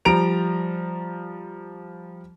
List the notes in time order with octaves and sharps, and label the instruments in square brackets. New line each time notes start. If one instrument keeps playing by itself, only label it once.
[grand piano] F3 G3 A#5 D7 F7